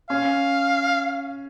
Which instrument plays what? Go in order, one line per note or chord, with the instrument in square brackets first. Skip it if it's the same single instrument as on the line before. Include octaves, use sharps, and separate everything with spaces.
[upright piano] C#4 [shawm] F5